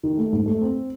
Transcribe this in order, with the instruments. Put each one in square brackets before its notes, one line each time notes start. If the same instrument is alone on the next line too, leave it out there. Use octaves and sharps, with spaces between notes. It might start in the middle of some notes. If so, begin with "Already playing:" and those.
[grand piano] D#3
A3
G#2
A3
C4